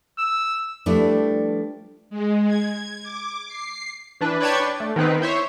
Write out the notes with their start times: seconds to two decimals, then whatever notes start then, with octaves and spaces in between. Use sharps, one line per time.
0.18 E6
0.86 F3 G3 A3 D4 E4 B4
2.10 G#3
2.47 G#6
3.03 D6
3.48 C7
4.21 E3 D4 B4
4.40 B4 C#5 D5 G5 A5 G#6
4.60 D4
4.80 A3
4.96 D#3 B3 C4 B4
5.20 E4 C5 C#5 E5